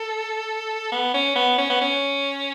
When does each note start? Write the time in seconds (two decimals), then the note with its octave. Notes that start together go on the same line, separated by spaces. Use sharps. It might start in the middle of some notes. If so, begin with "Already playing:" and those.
Already playing: A4
0.92 B3
1.14 C#4
1.36 B3
1.58 C#4
1.70 B3
1.81 C#4